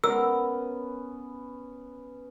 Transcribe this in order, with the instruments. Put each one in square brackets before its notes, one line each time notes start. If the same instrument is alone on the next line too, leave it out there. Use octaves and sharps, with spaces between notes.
[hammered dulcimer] B3 C#4 [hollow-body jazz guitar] A#4 [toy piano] E6